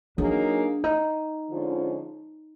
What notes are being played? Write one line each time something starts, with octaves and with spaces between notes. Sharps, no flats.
F#3 A#3 D4 D#4 G#4
D#4
D3 F3 G#3 C#4 F4